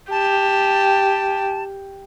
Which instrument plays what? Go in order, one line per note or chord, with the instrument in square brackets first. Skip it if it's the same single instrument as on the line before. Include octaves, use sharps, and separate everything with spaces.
[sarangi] G4 [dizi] A5